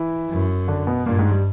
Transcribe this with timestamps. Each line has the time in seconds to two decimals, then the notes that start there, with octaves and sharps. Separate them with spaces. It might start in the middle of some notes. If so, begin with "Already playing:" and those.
Already playing: E3 E4
0.30 F#2
0.68 D3 D4
0.87 B2 B3
1.06 G2 A#2 A#3
1.19 G#2 G#3
1.32 G3